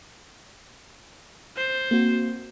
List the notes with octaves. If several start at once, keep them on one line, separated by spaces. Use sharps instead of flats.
C5
A#3 C4 F#4